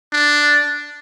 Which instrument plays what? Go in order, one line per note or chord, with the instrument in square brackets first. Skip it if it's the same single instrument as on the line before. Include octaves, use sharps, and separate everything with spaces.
[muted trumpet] D4